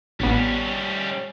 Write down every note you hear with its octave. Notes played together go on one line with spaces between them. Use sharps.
A1 G3 B3 C#4